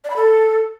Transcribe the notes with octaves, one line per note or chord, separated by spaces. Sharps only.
D5
B5
A4